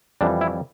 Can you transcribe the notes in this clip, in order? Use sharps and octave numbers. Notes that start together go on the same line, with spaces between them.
F2 E3 G3 D4
E4